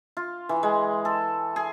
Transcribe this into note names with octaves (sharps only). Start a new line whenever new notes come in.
F4
E3
G#3
A4
G#4